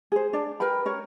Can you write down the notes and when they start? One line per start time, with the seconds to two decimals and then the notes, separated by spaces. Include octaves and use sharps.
0.12 G#4 C5
0.33 D4 D5
0.60 A#4 B4 G5 B5
0.85 C#4 A#4 C#5